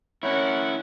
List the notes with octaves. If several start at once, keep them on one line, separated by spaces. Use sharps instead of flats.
C#4 E4 A#4 C#5 F#5